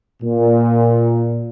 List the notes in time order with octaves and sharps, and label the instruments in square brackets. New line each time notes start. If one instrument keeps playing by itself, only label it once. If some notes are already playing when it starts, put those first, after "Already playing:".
[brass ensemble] A#2